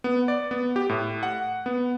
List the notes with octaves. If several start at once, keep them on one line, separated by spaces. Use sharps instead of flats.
B3
D5
B3
G4
A2
F#5
B3